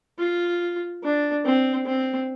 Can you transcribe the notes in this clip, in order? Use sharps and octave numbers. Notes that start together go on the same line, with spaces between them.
F4
D4
C4
C4